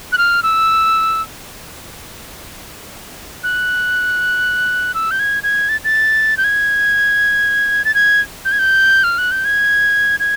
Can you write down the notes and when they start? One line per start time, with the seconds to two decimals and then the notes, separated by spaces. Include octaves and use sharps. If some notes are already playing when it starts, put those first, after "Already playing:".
0.12 F#6
0.18 F6
0.43 E6
3.44 F#6
4.94 E6
5.11 G6
5.19 G#6
5.43 G#6
5.69 A6
5.84 A6
6.37 G6
6.44 G#6
7.85 A6
7.95 G#6
8.45 G6
8.52 G#6
8.59 G6
9.04 F6
9.18 F#6
9.31 G6
9.45 G#6
10.20 G#6